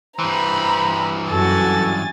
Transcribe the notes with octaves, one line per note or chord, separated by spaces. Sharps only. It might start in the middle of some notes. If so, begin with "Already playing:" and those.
G2 E3 C5 A#5 B5
F#2 F#4 A4 G#5 A6